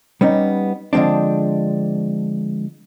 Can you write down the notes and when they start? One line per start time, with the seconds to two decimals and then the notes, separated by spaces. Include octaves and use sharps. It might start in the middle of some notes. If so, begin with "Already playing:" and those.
0.21 G3 B3 C#4 D#4
0.93 D3 F3 G#3 C4 D4